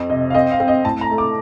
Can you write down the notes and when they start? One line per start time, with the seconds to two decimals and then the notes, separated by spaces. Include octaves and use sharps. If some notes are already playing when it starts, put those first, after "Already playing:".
Already playing: F2
0.10 C3 D#5
0.30 F5
0.34 C4 D#5
0.51 F5
0.60 C4
0.68 D#5
0.85 A2 A5
1.01 A#5
1.10 A3
1.18 D6